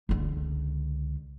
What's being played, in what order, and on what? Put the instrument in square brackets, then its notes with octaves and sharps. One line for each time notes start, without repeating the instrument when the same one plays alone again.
[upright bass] C#2 D3